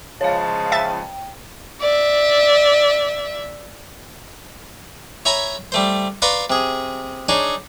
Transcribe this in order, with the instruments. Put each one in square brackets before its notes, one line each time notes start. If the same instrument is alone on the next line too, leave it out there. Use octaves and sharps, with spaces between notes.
[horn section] C#3 F3 G#3 [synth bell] C#5 F5 [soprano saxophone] A5
[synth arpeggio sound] E5 A6 [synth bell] G5
[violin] D5 E5
[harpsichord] C#5 E5 G#5 A#5 B5
G3 A3 C5
B4 D5 F5 A#5 C6 C#6
C3 G#4
D4 D#4 G#4 C#5